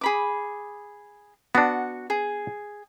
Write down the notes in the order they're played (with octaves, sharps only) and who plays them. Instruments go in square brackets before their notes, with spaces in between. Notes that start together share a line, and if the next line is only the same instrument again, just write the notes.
[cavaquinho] G#4 B5 D6
[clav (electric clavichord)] B3 D4 [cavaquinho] F#4 F#5
[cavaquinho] G#4